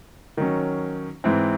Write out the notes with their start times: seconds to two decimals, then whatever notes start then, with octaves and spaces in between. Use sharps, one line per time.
0.37 D#3 F#3 C#4
1.24 G#2 E3 C4